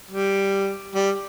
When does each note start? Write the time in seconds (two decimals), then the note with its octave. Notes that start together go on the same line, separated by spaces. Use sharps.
0.11 G3
0.95 G3